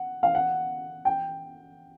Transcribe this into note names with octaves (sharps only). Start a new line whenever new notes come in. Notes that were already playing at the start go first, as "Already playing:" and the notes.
Already playing: F#5
F5
F#5
G5